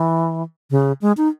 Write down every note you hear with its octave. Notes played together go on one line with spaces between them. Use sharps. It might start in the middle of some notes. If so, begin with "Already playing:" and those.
Already playing: E3
C#3
G#3
D#4